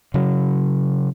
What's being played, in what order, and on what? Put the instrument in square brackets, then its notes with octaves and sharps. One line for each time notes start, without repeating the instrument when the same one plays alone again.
[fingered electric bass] C#3 F#3